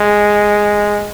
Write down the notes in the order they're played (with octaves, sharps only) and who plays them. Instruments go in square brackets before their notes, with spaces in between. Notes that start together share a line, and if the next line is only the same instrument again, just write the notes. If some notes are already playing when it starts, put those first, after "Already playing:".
Already playing: [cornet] G#3